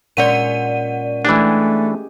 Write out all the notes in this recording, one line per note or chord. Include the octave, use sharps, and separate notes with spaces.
A#2 G#3 C#4 D5 F#5 D#7
E3 G#3 A3 D4 G4 G#4